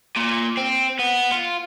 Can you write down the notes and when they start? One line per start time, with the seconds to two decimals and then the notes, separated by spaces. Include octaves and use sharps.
0.17 A#2
0.57 C4
0.99 B3
1.32 F4